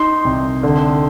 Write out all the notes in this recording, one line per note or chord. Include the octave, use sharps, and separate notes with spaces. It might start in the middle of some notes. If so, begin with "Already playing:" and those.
Already playing: D#4 C6
C2
D3